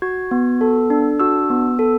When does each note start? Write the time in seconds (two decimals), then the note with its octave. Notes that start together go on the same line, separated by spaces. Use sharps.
0.02 F#4 G#6
0.31 B3
0.61 A4
0.90 D4
1.20 F#4 E6
1.50 B3
1.79 A4